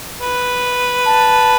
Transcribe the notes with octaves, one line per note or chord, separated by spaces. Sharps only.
B4
A5